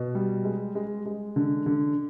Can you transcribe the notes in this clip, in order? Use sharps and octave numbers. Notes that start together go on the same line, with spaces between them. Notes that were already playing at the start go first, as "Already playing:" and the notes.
Already playing: B2
G3
G#3
G#3
G#3
D3
D3